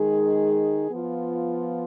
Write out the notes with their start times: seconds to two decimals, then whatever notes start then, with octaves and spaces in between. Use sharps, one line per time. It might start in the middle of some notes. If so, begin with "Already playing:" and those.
Already playing: D#3 G#3 D#4 G#4
0.89 F3 B3 F4